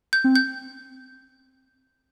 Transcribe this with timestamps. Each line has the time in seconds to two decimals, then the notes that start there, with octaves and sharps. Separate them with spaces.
0.13 G6
0.24 C4
0.36 G6